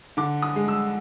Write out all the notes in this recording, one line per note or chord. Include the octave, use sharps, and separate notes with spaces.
D3 D6
D#6
G#3
E6